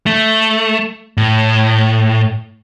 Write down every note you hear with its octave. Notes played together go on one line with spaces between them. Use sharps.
A3
A2